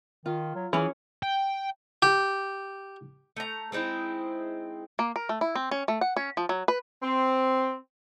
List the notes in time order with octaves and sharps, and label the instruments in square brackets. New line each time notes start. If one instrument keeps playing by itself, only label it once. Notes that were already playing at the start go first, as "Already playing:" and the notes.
[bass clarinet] D#3 [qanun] F4
[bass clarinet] F#3
[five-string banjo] E3 [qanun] C#4 C#5 [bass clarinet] G#4
[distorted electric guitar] G5
[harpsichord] G4
[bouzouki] A3 A#5
G#3 C4 D#4 E4
[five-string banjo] A#3
A#4
A3
E4
C4
C#4
A3
F#5
C#4
F3
F#3
B4
[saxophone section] C4